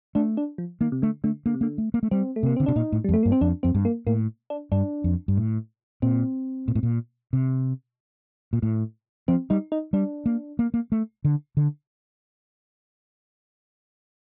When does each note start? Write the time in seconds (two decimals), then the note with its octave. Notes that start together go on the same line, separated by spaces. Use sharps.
0.15 A3 D4
0.37 D4
0.58 F3
0.81 D#3 A#3
0.92 C3
1.02 D3 A3
1.24 D3 A3
1.46 D3 A#3
1.54 C3
1.61 D3 A#3
1.78 A3
1.94 A#3
2.03 A3
2.11 G3 C4
2.36 A3
2.43 C3 A#3
2.56 D3 C4
2.66 C3 D4
2.76 A#2 D#4
2.92 A2
3.04 F2 G3
3.14 A3
3.23 G2 A#3
3.32 C4
3.41 F2 D4
3.63 F2 C4
3.75 G2
3.85 A#3
4.07 A2 A#3
4.50 D4
4.72 G2 D4
5.04 F2
5.28 G2
5.37 A2
6.02 A#2 C4
6.68 A#2
6.75 A2
6.83 A#2
7.33 C3
8.53 A#2
8.63 A2
9.28 F3 C4
9.50 G3 D#4
9.72 D#4
9.93 G3 D4
10.26 A#3
10.59 A#3
10.74 A#3
10.92 A3
11.25 D3
11.57 D3